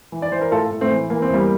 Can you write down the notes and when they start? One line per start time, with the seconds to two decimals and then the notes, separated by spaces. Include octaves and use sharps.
0.12 E3
0.22 D5
0.32 E3 C5
0.41 A#4
0.51 A2 F4 A4
0.71 A2
0.81 A3 C4
0.92 E3
1.10 E3 A#3
1.22 C4
1.30 E2 G3 A#3